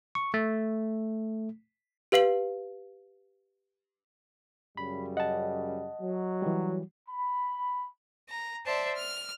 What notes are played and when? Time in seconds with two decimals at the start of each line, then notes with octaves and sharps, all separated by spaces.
0.15 C#6
0.34 A3
2.12 G4 B4 F5 C7 F#7
4.77 F#2 C#3 G3 B5
5.17 D#5 F#5 A5
6.00 F#3
6.42 E3 G3
7.09 B5
8.30 A#5
8.66 C5 D5 E5 A5
8.95 F6